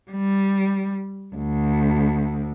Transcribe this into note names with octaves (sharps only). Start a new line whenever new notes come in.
G3
D2